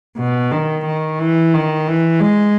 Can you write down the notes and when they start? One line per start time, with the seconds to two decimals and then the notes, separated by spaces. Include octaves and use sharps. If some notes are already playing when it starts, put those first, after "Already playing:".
0.17 B2
0.51 D#3
0.86 D#3
1.19 E3
1.54 D#3
1.88 E3
2.20 G#3